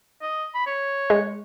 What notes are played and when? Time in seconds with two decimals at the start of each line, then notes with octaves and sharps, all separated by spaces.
0.22 D#5
0.54 B5
0.67 C#5
1.10 G#3